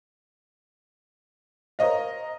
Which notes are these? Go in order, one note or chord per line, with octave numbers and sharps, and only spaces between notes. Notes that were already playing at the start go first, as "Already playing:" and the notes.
A#4 C5 C#5 D#5 F5